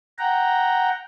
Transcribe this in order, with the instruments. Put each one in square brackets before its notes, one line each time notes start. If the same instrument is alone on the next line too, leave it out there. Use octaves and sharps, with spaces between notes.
[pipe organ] F#5 G5 A#5